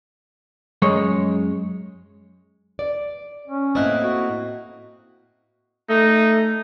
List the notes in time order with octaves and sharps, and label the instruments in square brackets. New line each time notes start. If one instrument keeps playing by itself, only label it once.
[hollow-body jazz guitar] F#2 G#3 C#5
[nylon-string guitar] D5
[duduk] C#4
[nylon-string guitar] A2 A#3 C4 [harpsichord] D#4 E4 F#5
[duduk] F#4
[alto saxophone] A3 [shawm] D#4